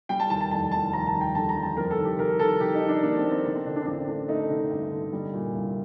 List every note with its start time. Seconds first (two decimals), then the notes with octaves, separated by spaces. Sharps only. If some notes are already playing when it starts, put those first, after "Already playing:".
0.09 G3 G5
0.20 A5
0.30 D#2 A5
0.41 A5
0.51 F1 A5
0.71 F1 A5
0.93 D#2 A#5
1.07 A5
1.14 G3
1.21 G5
1.35 D3 A5
1.49 A#5
1.56 G3
1.63 A5
1.77 F2 A#4
1.91 A4
1.98 D#3
2.05 G4
2.18 D#3 A#4
2.39 D#3 A4
2.60 D#3 G4
2.75 D#4
2.82 D#3
2.89 D4
3.03 A#3 D4
3.17 C4
3.24 A#3
3.31 C4
3.45 D3 C4
3.55 C4
3.66 D3 D4
3.76 D4
3.82 C4
3.86 A1 D4
4.08 A3 D4
4.28 A3 D#4
4.50 D3
4.71 G2
4.91 D3
5.13 G3
5.33 A#2
5.55 C2